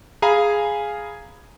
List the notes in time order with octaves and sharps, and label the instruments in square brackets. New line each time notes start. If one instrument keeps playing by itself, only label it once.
[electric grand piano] G#4 F5 G#5 A#5 B5